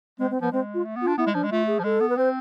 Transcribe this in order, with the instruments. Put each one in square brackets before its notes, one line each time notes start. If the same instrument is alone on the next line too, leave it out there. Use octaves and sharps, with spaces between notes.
[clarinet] G#3 [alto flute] C4
[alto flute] C4
[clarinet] F3 [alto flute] B3
[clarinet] G#3 [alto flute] C4
[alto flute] F4
[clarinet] A3
B3
[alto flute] F4
[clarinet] D4
[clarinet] B3 [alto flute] E4
[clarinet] G#3
[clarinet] F3 [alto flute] D4
[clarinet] G#3
[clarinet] A3 [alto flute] F4
[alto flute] G#4
[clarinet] F3
[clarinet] G#3 [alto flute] A4
[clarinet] B3
[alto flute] B4
[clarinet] C4 [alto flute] C5